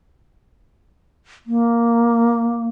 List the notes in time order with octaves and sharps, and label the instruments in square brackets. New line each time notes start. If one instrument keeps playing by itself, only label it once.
[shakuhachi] A#3